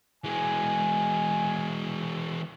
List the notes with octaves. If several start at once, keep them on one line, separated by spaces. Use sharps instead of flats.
E3 G#3 G#5